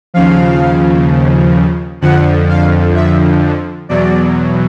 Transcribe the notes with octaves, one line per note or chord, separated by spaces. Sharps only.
D#2 C#3 F3 F5
F2 D3 F3 F#5
F5
E5
E2 B2 F#3 D5